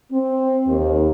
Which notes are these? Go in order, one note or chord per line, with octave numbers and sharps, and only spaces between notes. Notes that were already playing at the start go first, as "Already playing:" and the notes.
C4
D#2